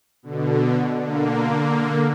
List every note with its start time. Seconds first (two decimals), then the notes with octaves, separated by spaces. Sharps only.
0.23 B2 D3
1.01 D3 A#3